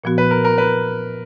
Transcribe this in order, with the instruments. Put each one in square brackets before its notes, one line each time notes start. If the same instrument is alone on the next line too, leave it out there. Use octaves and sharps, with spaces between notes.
[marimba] A#2 F3 B3 F#4
[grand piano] B4
A#4
A#4
B4